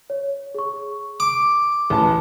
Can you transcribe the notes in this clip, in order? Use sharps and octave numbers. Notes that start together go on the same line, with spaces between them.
C#5
G#4 C#6
D6
A1 A5